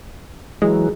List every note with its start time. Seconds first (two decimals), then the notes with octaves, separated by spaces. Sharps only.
0.62 E3 F#3 G#3